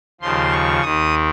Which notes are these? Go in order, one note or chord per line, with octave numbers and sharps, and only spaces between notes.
D#2 C#3 F3 C6
C#6
D#2 D#3 D#6